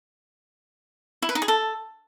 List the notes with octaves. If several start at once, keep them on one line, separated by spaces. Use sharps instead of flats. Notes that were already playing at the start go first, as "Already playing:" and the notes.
E4
B4
D#4
G#4
A4